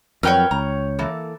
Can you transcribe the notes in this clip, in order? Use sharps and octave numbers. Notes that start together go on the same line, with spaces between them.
F2 F#3 A#4 B4 C#5 G5 F6
C#2 A#5
E3 A#3 A4